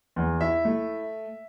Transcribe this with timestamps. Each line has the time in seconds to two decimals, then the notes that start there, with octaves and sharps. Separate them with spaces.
0.16 E2
0.40 E4 E5
0.65 A3